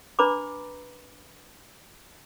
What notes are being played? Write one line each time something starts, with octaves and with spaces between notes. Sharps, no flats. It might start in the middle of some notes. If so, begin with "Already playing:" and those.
D4 B4 A#5 B5 D6